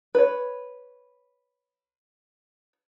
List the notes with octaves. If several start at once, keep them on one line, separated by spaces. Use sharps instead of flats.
B4 C#5